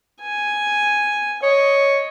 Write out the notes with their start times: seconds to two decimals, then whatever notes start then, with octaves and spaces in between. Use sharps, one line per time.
0.21 G#5
1.43 C#5 D#5